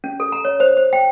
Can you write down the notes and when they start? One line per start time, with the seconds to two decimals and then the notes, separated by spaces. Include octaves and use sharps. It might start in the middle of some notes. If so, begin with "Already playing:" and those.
0.04 C#4
0.20 A4
0.32 A#5
0.45 C#5
0.60 C5
0.77 C5
0.93 G5